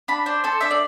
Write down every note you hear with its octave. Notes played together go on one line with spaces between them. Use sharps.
D4 B5
D4 C5
A4 C5
D4 E5
D5